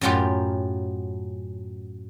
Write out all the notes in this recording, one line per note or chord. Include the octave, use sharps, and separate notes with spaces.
F#2 A2 F#3 F4 G4